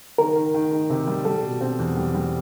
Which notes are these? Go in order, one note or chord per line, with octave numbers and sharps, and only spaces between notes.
D#3 A#4
D#3
D#3
D#3
C3
G3
G3 A4
B2
C4
E2
G3
G3